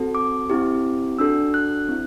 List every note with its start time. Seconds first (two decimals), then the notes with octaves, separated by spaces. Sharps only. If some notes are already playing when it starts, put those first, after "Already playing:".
Already playing: C4 F#4 A4
0.15 D6
0.50 C4 E4 G4
1.19 D4 F#4 A4 E6
1.54 F#6
1.89 C4 E4